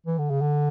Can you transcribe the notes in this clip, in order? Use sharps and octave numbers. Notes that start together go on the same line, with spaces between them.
E3
D3
C#3
D3